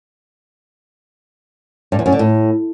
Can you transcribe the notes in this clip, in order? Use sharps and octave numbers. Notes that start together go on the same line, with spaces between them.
G2
E2
F#2
D3
A2